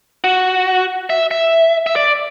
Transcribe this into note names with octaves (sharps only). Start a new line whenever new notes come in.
F#4
E5
E5
E5
D5